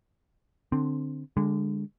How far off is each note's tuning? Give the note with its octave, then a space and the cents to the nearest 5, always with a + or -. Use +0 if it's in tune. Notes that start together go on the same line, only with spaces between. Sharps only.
D3 +15 C4 +5
D3 +0 G#3 -30